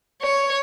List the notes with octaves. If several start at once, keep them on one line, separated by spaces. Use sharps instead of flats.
C#5